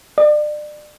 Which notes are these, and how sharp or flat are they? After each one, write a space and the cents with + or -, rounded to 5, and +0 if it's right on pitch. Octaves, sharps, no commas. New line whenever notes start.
D5 +35